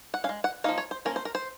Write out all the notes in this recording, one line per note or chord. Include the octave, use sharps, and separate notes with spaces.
F#5
C#4 F5
G#3
F#5
F3 A#3 D#4 F5
C#5
C5
F3 A#3 C#4 A#4
C5
A#4
C5